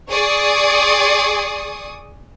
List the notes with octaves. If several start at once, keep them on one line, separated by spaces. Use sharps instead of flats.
G#4 D5 C#6 D#6